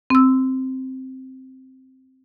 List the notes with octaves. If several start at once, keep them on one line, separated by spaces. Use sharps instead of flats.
C4 E6